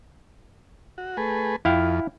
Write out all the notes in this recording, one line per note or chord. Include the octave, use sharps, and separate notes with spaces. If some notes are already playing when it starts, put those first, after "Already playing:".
F#4
A3 G#4 B4
F2 E4 F5 G5